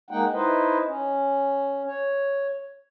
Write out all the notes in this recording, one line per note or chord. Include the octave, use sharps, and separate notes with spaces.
G#3 A#3 D#4 F#5 G5
D#4 E4 B4 C5 D#5
C#4
C#5